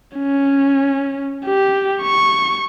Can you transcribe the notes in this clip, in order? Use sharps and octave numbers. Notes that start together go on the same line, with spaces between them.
C#4
G4
C#6